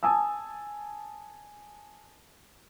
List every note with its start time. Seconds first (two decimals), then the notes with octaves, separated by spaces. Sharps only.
0.03 G#5 A5 D#6 E6